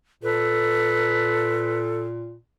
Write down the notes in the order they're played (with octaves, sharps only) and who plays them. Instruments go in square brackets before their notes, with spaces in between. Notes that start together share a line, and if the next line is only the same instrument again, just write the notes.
[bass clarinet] A#2 [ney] A4 [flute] B4